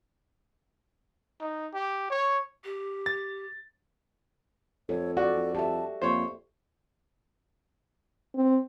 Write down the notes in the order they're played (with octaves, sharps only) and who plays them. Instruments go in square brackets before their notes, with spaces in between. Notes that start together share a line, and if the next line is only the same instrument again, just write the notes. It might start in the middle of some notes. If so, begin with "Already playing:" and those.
[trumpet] D#4
G4
C#5
[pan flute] G4
[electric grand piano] A6
[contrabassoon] F2 [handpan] A4 [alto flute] C#5
[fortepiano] F#4 [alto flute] A4 [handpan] D5
[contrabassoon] F2
[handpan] G4 A4 E5 [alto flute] A5
[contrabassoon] F2 [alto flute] A#3 [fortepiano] C5 C#5
[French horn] C4